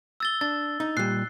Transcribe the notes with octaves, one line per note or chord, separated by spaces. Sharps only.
E6 A6 G7
D4 A6
D#4
A#2 G3 F#6 C7